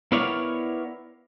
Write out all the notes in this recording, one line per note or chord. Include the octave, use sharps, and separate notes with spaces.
B3 E4 A#4 C#5 D5 F5